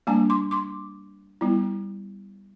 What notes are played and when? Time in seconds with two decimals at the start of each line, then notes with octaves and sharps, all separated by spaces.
0.07 G3 A#3 D4 G#5 A#5
0.30 C6 D6
0.51 C6 D6
1.41 G3 B3 E4